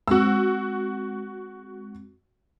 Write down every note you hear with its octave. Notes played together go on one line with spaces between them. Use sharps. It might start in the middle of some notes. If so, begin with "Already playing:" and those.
G#3 C4 F#4 E6